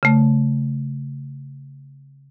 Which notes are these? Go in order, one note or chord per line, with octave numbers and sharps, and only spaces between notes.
C#3 A3